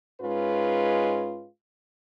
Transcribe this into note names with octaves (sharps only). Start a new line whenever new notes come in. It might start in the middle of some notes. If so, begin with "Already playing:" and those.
G#2 G#3 C#4 F4 B4